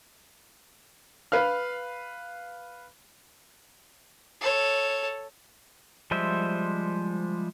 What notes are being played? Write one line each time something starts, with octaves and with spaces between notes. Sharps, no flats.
B4 F5 F6
A4 C#5
F3 G3 G#3 C5 E5